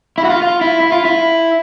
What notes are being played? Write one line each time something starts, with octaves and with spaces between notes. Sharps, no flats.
E4
F#4
F4
F4
E4
E4
F4
E4